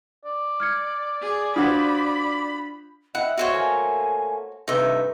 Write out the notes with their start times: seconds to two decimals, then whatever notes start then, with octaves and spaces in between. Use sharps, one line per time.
0.24 D5
0.60 F6 G#6 C#7
1.21 G#4
1.56 D4 F4 F#4 C5 B5 D#6 G#6
3.15 E4 D#5 F#5
3.38 F#4 C5 C#5
3.53 A3 A#3 G#5
4.68 G2 C3 A3 D#4 B4 E5